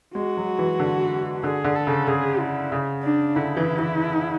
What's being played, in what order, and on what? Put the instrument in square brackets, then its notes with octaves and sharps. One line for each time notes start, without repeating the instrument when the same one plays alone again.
[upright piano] G#3 [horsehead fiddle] F#4
[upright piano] F#3
E3
D3
[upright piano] D3 [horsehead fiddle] G#4
[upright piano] D3
[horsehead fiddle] A4
[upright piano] C#3
[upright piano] C#3 [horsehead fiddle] G#4
[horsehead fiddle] E4
[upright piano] C#3
[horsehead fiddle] D4
[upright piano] D3 [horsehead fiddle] E4
[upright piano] E3
E3